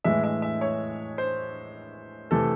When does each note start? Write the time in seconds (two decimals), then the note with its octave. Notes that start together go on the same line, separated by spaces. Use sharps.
0.04 A2 E3 G#3 E5
0.24 E5
0.42 E5
0.61 C#5
1.18 C5
2.31 C3 E3 A3 A4